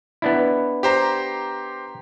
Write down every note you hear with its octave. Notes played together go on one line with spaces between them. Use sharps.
B3 D4 E4
G4 C5 A#5